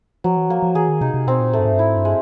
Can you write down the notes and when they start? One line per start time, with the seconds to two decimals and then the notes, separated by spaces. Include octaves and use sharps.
0.24 F3 F#3
0.37 E3
0.49 F3 A#3
0.63 F3
0.75 E3 G#4
0.88 D#3
1.01 C3 D#4
1.14 C3
1.27 B2 C4
1.40 A#2
1.53 A2 A3
1.59 G2
1.65 G#2
1.72 G2
1.79 G#2 E4
1.96 G2
2.05 G#3